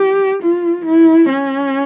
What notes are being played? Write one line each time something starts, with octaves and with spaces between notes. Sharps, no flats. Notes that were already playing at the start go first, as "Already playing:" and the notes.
Already playing: G4
F4
E4
C#4